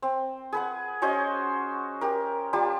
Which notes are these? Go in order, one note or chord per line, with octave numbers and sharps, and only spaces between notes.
C4
G#4 B4 F#5
C#4 F#4 C5 D#5
G4 A#4
G3 F4 G4 A5